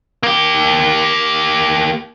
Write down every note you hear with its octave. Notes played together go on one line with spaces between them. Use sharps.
A#3 G4